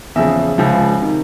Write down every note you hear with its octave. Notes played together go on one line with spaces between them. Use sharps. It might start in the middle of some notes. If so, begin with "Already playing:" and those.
E2 C#3 F3 E5
C#2 C#3 F3
C3 D#3